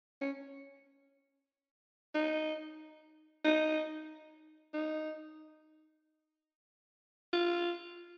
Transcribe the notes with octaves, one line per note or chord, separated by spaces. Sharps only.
C#4
D#4
D#4
D#4
F4